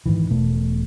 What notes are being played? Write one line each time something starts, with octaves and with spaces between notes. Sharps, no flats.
G#2 D#3 E3
E1 B2 A3